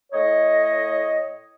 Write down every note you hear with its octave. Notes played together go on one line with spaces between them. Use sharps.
A2 C#5 D#5